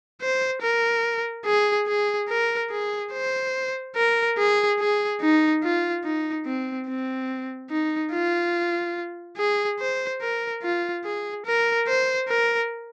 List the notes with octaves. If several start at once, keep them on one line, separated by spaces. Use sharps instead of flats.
C5
A#4
G#4
G#4
A#4
G#4
C5
A#4
G#4
G#4
D#4
F4
D#4
C4
C4
D#4
F4
G#4
C5
A#4
F4
G#4
A#4
C5
A#4